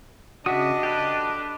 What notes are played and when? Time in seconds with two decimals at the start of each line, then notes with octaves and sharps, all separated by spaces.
0.46 C#3 D4 F#4 D#5 E5 D#6
0.83 G4 A4 B4